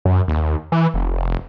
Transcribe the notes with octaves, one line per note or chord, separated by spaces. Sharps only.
F#2
D#2
E3
F1